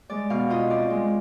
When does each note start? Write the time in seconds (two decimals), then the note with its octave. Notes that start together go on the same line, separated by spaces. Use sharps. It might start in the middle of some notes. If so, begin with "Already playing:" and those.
0.10 G#3 D5
0.30 B2 F5
0.50 F4 D#5
0.70 C4 D5
0.90 G#3